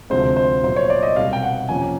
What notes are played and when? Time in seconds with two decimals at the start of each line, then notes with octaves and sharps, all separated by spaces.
0.10 D2 C3 F3 G#3 C4 C5
0.37 C5
0.63 A#2 F#3 B3 C5
0.76 C#5
0.90 D5
1.03 D#5
1.16 C2 B2 G3 C4 F5
1.33 G5
1.43 F#5
1.69 F2 C3 F3 A#3 C#4 G#5